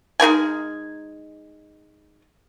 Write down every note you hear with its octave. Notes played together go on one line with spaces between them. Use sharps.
G#3 D#4 A#4 G#5